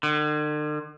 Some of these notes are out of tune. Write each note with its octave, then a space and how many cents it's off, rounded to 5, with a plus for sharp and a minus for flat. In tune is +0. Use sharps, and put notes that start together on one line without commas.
D3 +45